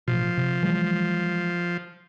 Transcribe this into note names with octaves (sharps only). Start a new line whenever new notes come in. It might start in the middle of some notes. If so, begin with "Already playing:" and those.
A1 B2 F3
C3
E3 F#3 G#3